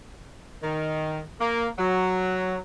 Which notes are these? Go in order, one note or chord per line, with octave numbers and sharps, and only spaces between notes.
D#3
A#3
F#3